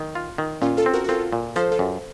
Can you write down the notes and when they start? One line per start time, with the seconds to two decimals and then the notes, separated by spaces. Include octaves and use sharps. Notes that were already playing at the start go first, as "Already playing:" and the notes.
Already playing: D#3
0.15 F4
0.38 D#3
0.62 A#2 C#4 F4
0.77 F4 A4
0.86 C4
0.94 F#4 A#4
1.04 F#4
1.09 C4 F4 A4
1.33 A#2
1.56 F3 A4 C5
1.72 F4 A4
1.79 F#2